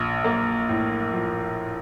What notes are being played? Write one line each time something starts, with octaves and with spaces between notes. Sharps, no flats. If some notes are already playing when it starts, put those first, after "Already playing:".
Already playing: A#1
A#3
A2
F3